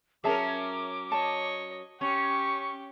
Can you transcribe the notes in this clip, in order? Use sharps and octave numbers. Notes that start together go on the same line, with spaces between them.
F#3 C#4 G#4 A#4 E5 A5 D6
C#5 D#5 A5
C#4 G4 C#6